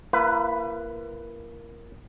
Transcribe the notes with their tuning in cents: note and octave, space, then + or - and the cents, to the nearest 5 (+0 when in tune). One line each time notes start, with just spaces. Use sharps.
A#3 +0 E4 +45 B4 +5